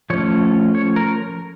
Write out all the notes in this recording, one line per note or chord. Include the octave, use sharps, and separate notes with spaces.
F3 A3 C#4 C#5
C#5
A#4